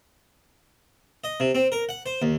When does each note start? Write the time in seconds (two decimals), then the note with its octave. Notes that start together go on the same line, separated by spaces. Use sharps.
1.24 D#5
1.40 C3
1.55 C4
1.72 A#4
1.89 F#5
2.06 C5
2.22 D#2